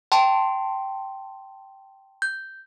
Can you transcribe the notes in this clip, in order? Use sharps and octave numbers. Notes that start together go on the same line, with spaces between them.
G5 A5 C6
G6